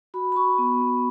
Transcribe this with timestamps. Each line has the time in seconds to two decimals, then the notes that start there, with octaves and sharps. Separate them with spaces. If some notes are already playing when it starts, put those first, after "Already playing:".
0.14 F#4 B5
0.32 B5
0.36 F#4 C#6
0.58 B3
0.81 B3